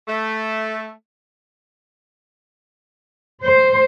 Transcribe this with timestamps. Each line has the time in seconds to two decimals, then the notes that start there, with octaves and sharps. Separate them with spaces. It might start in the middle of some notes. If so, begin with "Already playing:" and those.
0.07 A3
3.44 C5